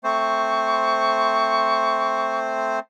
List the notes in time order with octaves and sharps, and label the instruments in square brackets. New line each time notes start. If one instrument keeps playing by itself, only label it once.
[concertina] A3 C4 C5 [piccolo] C#6